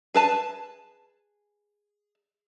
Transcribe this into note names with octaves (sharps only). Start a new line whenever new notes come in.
G#4 B4 A5